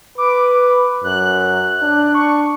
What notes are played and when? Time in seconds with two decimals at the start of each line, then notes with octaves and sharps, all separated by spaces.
0.18 B4 D6
1.04 F#2 F#6
1.82 D4
2.15 C#6